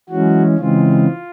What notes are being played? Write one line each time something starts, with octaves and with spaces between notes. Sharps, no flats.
E3 F#3 G#3 C#4 F#4
C#3 E3 G#3 C4 F4